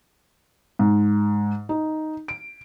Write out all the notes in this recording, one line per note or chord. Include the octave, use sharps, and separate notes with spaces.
G#2
D#4
D7